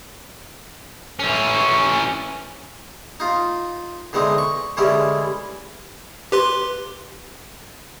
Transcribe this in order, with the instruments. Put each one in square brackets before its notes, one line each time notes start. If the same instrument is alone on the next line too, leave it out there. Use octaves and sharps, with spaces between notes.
[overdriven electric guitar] E3 C#4
[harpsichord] D#4 F4
D3 E3 G#3 C4 D#4
C#6
D3 E3 G3 G#3 C#4 E4
[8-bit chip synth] G4 B4 C6